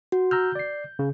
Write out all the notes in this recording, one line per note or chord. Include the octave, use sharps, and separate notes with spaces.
F#4
A#5 E6 F6 G6
D5 C7
C#3